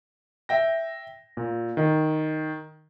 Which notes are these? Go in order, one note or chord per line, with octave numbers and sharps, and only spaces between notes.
E5 G5 A#6
A#2
D#3